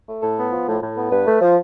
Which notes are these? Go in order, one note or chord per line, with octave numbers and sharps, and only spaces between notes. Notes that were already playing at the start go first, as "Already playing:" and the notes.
A3
A2 A4
B3
F3
A2
A2
B3
G2 B4
A3
F3